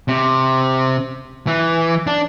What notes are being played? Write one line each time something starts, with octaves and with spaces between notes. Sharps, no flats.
C3
E3
D4